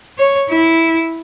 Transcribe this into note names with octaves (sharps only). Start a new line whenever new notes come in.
C#5
E4